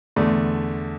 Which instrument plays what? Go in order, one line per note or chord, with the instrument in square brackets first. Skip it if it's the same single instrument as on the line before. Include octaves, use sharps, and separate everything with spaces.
[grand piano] E2 D3 A3